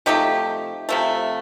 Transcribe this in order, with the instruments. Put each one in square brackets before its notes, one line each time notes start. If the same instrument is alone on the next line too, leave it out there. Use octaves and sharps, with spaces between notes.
[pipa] C3 F3 A3 D#4 G4
C3 F3 A3